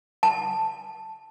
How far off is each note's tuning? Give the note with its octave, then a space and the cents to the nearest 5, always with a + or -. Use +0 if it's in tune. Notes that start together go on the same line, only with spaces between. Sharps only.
A5 +0